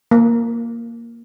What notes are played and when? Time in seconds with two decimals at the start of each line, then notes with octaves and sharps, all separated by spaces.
0.11 A#3